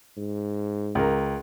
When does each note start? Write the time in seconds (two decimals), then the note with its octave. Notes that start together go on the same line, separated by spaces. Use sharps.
0.17 G#2
0.95 C#2 A#4